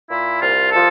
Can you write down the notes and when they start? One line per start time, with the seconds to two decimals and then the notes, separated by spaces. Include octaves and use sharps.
0.09 A#2 E4
0.39 C2 F4
0.70 F3 A4